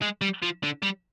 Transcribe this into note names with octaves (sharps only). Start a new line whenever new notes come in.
G#3
G3
F3
D3
G3